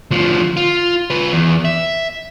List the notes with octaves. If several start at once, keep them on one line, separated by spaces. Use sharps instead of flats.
D2 F3
F4
F4 B4
E2
E5